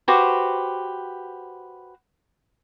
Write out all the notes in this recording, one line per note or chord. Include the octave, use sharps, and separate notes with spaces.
F#4 G4 B4 C5